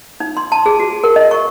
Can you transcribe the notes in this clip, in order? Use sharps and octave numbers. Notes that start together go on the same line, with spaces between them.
D#4
C6
A5
G#4
F#4
A#4
D#5
C#6